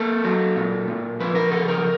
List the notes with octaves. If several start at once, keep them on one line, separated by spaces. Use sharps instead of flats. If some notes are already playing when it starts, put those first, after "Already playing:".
Already playing: A#3 A4
F#3
A#2
A#2
F3 B4
A#4
C#3 A4
A#4